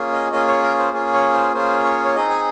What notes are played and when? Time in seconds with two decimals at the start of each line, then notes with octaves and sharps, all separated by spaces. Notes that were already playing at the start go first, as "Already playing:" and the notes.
Already playing: A#3 C#4 F4 G#4
0.12 D#5
0.32 A#3 C#4 F4 G#4 D#5
0.48 C#5
0.62 A#4
0.78 C5
0.93 A#3 C#4 F4 G#4
1.14 C#5
1.33 C5
1.54 A#3 C#4 F4 G#4 C5
1.84 C#5
2.05 C#5
2.15 C4 D#4 G#4 D#5
2.29 G#5